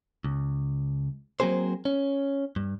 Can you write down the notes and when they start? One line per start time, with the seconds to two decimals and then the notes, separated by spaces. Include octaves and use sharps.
0.24 C#2
1.40 F#3 A#3 C4 G#4 C5
1.85 C#4
2.56 G2